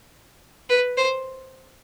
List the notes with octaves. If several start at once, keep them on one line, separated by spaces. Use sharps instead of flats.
B4
C5